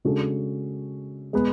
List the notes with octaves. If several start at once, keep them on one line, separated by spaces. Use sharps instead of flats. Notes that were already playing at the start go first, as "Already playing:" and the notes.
C#3 G#3 D4 F#4 A4
G#3 B3